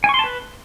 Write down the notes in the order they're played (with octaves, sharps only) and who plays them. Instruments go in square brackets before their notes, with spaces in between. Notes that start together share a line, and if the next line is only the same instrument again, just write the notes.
[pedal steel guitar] G#5
C#6
C6
A5
B4